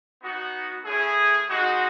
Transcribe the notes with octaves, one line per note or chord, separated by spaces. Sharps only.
B3 D#4 F#4
A3 C#4 E4 G#4
G#3 D#4 F#4